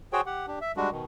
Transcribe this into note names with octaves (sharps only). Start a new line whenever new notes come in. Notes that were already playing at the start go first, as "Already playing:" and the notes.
F#4 G#4 C5 C#5 G5
G4 F#5
D4 G4
E5
G3 G#3 D4 F#4
B2 D#3